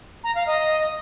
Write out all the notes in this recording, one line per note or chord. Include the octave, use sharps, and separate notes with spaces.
A#5
F5
D#5